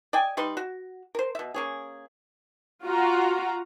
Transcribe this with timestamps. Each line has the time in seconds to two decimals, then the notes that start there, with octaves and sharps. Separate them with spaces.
0.13 D5 D#5 G5 G#5
0.37 G3 D#4 B4 C6
0.57 F#4
1.15 A#4 C5
1.35 B2 E5
1.54 A#3 C#4 G#4
2.85 F4 F#4 A#5